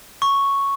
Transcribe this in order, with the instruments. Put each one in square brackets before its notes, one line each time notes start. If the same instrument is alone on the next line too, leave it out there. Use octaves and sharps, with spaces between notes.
[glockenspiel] C#6